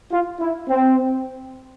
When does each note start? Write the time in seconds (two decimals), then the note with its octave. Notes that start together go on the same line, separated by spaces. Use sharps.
0.12 F4
0.40 E4
0.69 C4